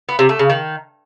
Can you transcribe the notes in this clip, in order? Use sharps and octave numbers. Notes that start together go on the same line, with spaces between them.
B3
C3
A3
C#3
D#3